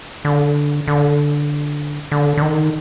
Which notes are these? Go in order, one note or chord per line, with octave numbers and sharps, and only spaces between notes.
D3
D3
D3
D3
D#3